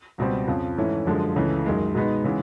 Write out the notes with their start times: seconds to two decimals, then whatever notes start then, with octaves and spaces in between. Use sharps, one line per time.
0.18 C#2 B2 G3 C4
0.48 F2 C#3 F3
0.77 G#2 E3 A3 C#4 E4
1.06 F#2 D3 F3 G#3
1.36 C#2 C#3 E3 A3
1.66 F#2 D#3 G#3
1.95 B2 G#3 B3 D#4
2.24 C#3 E3 G#3 B3